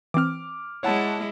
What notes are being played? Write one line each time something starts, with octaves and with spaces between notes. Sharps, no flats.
E3 C4 D6 F6
G#3 E4 C#5 F#5 A5